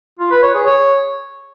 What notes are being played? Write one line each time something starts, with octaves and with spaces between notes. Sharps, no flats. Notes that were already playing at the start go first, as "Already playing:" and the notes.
F4
B4
C#5
G#4
C#5